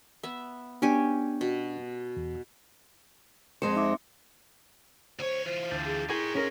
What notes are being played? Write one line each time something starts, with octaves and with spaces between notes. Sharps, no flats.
B3 E5
B3 C#4 D4 G4 G#5
B2
E2
F2 G#3 C4 C5 C6 C#7
D#4 E5 D6
D2 C5 C#5
E3 F4 C5
D2 G5 A5
G#4
D#4 E4 G#4 A#4 G5 G#5 C6 C#6
C#4 F4 A#4